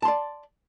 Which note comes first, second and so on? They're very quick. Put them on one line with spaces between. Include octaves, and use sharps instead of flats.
A5 C6 D5